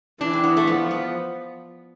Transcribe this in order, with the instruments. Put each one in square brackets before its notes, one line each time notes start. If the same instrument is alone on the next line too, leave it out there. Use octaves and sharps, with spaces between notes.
[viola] E3 [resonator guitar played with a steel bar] D4
[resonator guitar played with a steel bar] C4
B3
A3
[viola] F3 [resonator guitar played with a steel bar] B3
[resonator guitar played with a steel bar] B3